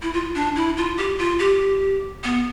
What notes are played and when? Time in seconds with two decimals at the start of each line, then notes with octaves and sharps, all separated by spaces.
0.02 E4
0.13 F4
0.35 D4
0.56 E4
0.77 F4
0.97 G4
1.18 F4
1.39 G4
2.24 B3